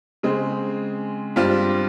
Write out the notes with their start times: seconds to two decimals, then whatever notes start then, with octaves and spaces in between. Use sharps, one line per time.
0.23 C#3 G#3 C4
1.36 G2 G3 C4 F4